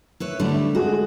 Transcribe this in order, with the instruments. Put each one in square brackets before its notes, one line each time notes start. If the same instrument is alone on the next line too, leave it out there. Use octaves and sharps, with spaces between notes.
[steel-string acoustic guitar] E4 B4 C#5
[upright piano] D3 [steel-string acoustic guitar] G3 A3 E4
[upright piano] G#3 G#4 A4 [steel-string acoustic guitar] F#4